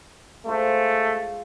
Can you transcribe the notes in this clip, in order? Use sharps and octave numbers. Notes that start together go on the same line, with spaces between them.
G#3 A3 F4 C5